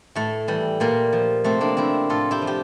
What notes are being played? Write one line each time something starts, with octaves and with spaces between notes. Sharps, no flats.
A2 A3
E3 G3
A#2 G3 A#3
F3
C3 A3 C4
A#3 D4
F3 C4 E4
A2 F4 A4
E4 G4
F3
G4